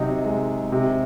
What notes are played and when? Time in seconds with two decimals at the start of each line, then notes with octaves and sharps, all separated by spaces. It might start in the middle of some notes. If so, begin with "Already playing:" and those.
Already playing: C3 F#3 D#4
0.25 G#3
0.72 C3